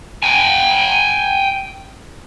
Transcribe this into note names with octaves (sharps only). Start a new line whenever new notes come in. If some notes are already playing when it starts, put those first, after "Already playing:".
G5 G#5